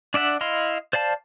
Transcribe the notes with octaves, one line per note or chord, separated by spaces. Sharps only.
D4 D5 E5 F#5
E4 D#5 F5 C6
C5 D5 F5 A5